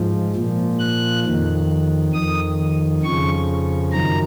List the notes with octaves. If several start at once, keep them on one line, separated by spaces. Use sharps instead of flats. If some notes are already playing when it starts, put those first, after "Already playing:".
Already playing: G#2 F3
A#2 F3
F#6
F2 D#3
F2 D#3 D#6
F2 C#3 F3 C#6
F#2 D#3 A#5